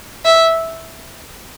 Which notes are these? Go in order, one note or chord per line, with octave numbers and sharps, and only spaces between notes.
E5